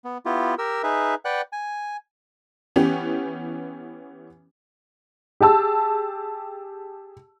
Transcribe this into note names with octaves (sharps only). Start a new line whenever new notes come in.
B3
B3 E4 F4 G4
G4 A#4 E6
D#4 G#4 B4 E5
B4 D5 F#5 G5 F#6
G#5
E3 B3 C#4 G4
G4 G#4 A5 E6